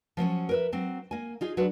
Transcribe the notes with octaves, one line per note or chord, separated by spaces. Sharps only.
F3 F#3 C4 C#4
A#4 B4 E5
F#3 C4
A#3 G#5
D#4 F4 G#4
F#3 D4 F#4 B4